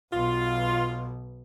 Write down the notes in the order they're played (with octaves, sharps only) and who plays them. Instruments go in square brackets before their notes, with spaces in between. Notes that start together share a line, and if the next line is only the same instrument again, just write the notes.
[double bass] B1 B2 [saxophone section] F4